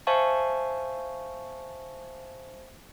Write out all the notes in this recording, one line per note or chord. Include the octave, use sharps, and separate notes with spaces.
C5 E5 F5 G#5 A5 C#6